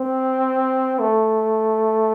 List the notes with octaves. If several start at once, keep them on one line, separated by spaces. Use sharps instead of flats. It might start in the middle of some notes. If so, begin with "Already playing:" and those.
Already playing: C4
A3